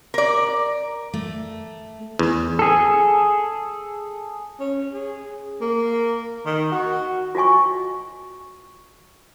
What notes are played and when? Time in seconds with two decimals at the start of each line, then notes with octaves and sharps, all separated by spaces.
0.14 A#4 D5
1.14 A3
2.19 E2
2.59 G#4 A4
4.60 C#4
4.93 G#4
5.61 A#3
6.46 D#3
6.72 F#4
7.35 F4 F#4 D#5 G#5 C#6